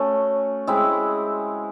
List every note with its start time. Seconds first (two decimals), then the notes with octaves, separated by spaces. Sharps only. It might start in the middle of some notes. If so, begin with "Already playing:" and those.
Already playing: A3 C#4 F#4
0.67 G#3 C4 E4